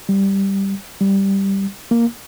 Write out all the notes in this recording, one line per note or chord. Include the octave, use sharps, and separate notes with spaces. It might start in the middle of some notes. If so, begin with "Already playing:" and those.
G3
G3
A#3